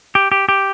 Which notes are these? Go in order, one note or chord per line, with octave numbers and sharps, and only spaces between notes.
G4
G4
G4